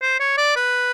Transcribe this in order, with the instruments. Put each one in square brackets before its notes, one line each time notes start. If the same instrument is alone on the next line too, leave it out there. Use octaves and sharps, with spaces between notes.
[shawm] C5
C#5
D5
B4